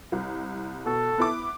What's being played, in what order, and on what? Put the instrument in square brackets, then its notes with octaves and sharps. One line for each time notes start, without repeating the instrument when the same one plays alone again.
[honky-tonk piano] C2
[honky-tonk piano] B2 [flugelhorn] A4
[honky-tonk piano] B3 E4 D6